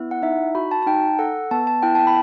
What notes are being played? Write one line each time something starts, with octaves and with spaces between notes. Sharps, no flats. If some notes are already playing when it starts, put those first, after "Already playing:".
Already playing: B3 E4
F#5
D#4 E5
F#4 B5
A5
A5
D#4 G5
A4 F#5
B3 A5
A5
E4 G5
A5
G5
B5